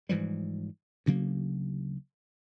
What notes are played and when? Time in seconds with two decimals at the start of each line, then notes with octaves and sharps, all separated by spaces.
0.09 G#2 E3 F3 G3
1.06 D2 C#3 F#3 A#3